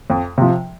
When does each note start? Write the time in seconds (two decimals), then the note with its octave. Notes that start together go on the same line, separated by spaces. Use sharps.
0.10 F2
0.38 C3 F3